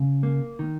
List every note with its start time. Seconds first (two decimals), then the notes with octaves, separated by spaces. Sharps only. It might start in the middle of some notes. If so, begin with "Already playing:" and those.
Already playing: C#3
0.23 A#3
0.59 D#3